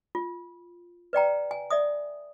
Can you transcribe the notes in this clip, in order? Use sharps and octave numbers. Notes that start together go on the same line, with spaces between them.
F4
B4 D5 G5 A#5
G#5
D5 E5 D#6